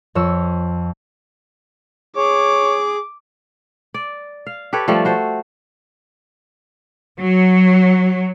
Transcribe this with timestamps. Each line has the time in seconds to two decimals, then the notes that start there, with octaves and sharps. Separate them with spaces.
0.15 F2 C#5 E6
2.17 G#4 C#5 D6
3.94 D5
4.47 F5
4.73 G4 A4 B4 C#5
4.88 F3 G3 A3 A4
5.05 F#4 C5
7.19 F#3